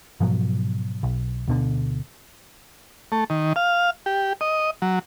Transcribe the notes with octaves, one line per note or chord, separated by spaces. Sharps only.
G#2 B2 F3 F#3
B1
D2 B2 D3
A3
D#3
F5
G4
D#5
F#3